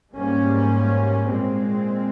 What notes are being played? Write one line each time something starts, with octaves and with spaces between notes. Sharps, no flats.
G#2 G3 A#3 C#4
A#2 G#3 C4